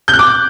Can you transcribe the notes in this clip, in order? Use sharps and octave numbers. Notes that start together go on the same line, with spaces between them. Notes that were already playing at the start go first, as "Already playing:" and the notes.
G6
F#6
D6